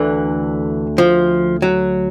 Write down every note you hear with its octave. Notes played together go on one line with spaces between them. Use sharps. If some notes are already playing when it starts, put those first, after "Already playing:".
Already playing: D2 D3 E3
F3
F#3